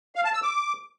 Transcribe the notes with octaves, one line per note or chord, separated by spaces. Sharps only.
F5
A5
E6
D6